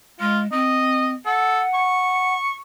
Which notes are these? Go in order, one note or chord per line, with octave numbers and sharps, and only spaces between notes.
G#3 F4
C4 D#5
A4 F#5
C#6